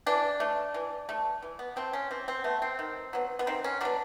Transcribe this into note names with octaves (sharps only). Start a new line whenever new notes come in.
E3 D4
A3
E3
A3
E3
B3
A3 C4
C#4
E3 C4
C4
A3 B3
C4
D#3
F#3 B3
B3
D#3 C4
C#4
F#3 B3 D4